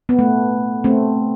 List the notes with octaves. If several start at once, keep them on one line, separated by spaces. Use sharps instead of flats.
B3
A3
A3 C4